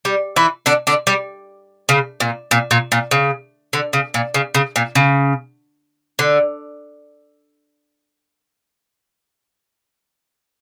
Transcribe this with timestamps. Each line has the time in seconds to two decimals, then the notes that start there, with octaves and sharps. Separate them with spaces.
0.05 G3
0.36 E3 E4
0.66 D3 D4
0.87 D3 D4
1.07 G3
1.89 C#3
2.20 A#2
2.51 A#2
2.71 A#2
2.92 A#2
3.11 C#3
3.73 D3
3.93 C#3
4.14 A#2
4.34 C#3
4.55 C#3
4.76 A#2
4.95 C#3
6.19 D3